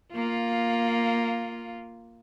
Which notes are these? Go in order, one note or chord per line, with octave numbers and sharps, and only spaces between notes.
A#3 F4